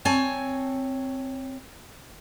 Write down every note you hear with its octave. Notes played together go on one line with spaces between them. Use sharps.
C4 C#5 G#5 A5